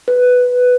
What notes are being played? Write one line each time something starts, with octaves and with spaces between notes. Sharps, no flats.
B4